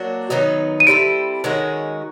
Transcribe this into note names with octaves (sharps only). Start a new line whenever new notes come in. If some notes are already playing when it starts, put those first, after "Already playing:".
Already playing: F#3 A#3 D4 F#4
D#3 F#3 B3 D#4
D#7
G3 C4 E4 A4 D7
D#3 G#3 C#4 F#4